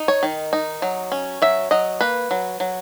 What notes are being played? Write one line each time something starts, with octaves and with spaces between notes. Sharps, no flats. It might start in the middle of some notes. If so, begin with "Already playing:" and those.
Already playing: D#4
C#5
D#3
D#4
F#3
C#4
F#3 E5
F#3 D#5
A#3 B4
F#3
F#3